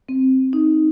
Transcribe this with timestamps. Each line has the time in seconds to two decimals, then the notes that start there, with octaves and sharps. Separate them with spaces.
0.09 C4
0.53 D#4